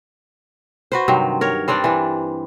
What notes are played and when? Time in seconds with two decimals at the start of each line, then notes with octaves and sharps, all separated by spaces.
0.92 F#4 B4 C5
1.08 G2 C3 D#3 F#3
1.41 A#4 C#5
1.68 G3 C4 D4 D5
1.84 E3 D4